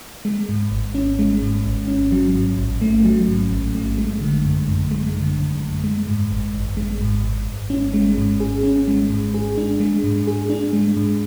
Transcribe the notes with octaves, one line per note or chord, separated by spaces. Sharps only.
G#3
G#2
G#1
C#4
G#3
G#2
G#1
C#4
F#3
G#2
A1
A3
F#3
G#2
A1
A3
G#3
D3
F#2
F#2
G#3
D3
F#2
F#2
G#3
G#2
G#1
G#1
G#3
G#2
G#1
G#1
C#4
G#3
G#2
G#4
C#4
G#3
G#2
G#4
D4
G#3
G#2
G#4
D4
G#3
G#2